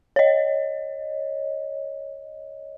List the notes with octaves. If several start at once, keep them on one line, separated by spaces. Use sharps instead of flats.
C#5 D#5